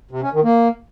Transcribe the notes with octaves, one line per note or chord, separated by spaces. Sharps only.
C3
C#4
D#3
A#3